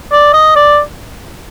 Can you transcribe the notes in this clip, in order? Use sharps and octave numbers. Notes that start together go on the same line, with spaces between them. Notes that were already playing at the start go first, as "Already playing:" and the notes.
D5
D#5
D5